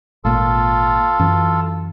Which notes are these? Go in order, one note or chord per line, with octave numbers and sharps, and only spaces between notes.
G#1 A#2 F4 A4
F#2 E3